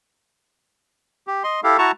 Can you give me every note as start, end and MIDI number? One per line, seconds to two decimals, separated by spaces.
1.27 1.43 67
1.44 1.60 75
1.44 1.60 84
1.64 1.77 64
1.64 1.77 67
1.64 1.77 69
1.64 1.77 77
1.78 1.91 64
1.78 1.91 66
1.78 1.91 81
1.78 1.91 82
1.78 1.91 85